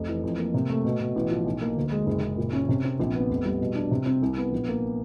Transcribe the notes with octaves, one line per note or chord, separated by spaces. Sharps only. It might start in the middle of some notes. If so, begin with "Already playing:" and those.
Already playing: F1
E3
F2
A#3
C3
A3
B2
B2
A1
F3
B1
A#3
D2
G#3
F#1
F#1
A#2
C#4
C3
C4
A#1
B3
F1
G3
B2
D4
C3
C4
C2
B3
A#1
A#3